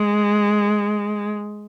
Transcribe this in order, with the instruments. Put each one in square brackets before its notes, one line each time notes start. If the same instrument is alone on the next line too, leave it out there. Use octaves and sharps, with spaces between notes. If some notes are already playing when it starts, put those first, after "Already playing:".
Already playing: [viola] G#3